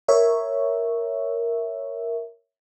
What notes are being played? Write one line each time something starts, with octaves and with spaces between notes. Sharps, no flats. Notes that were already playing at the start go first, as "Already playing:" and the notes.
A#4 C#5 E5